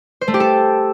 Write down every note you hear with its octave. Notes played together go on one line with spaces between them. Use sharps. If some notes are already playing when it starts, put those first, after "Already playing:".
C5
A3
G4
A4